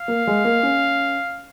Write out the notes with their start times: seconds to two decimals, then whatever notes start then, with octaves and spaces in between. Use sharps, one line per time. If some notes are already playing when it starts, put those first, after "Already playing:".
Already playing: F5
0.08 A#3
0.27 G#3
0.45 A#3
0.63 C#4